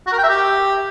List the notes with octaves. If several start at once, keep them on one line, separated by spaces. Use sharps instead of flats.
F#4
A#4
G5
E5
G4